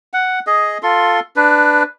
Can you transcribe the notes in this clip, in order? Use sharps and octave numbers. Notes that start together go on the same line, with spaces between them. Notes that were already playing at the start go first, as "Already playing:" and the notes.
F#5
G#4 D#5
F4 A4 C6
D4 B4